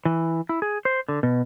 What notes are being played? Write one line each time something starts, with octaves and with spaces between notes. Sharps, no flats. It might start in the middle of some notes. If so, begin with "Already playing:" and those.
E3
E4
G#4
C5
D3
B2